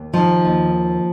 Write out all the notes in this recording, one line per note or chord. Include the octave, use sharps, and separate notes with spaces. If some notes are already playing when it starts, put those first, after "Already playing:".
Already playing: D#2
D#3 F3
D#2